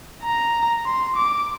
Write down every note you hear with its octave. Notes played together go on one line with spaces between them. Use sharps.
A#5
C6
D6